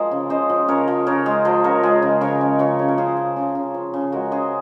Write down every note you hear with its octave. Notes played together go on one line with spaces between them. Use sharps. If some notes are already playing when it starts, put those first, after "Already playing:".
Already playing: F3 G#3 D#4 G#4 A#4 C5
C#3
C#3 C5 D#5
F3
C#3 A#4 C#5
F3
C#3 A#4 C#5
G#3 G#4 C5
F3 C5 D#5
C#3 A#4 C#5
G#3 G#4 C5
C#3
C#3 A#4 C#5
G#3
C#3 A#4 C#5
C#3
A#4
C#3 G#4 C5
F3
C#3
C#3
F3
C#3
G#3 F#4 A#4
C#3 G#4 C5